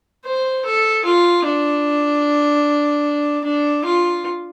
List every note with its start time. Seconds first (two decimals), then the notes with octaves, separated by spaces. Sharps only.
0.24 C5
0.65 A4
1.05 F4
1.44 D4
3.44 D4
3.85 F4